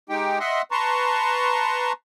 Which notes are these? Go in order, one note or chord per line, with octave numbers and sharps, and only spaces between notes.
G#3 D#4 G4 G5
D#5 E5 F#5 C6
B4 A5 A#5 C6 C#6